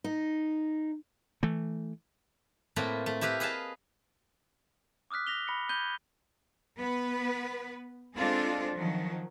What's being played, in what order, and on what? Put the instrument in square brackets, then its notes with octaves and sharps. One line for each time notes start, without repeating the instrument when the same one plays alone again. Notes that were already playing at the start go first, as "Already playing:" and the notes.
[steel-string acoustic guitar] D#4
[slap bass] E3 A3
[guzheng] A2 A3 A#3 C4 A#4 B4
A3
E4 G4 A#4 B4 F5
G#4 B4 D#5 F5 A5
[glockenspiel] D6 D#6 F6 F#6 B6
A#6 B6 F7 G7
B5 A#6 C#7
B5 G6 G#6 D#7 G7
[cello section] B3 B4
G#3 C4 D4 F4 A4
D#3 F3 F#3